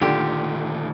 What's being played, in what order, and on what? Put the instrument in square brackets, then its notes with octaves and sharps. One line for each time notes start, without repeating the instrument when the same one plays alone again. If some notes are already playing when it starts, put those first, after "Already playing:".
[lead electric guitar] D2 D#3 [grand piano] A#2 [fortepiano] D3 [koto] G4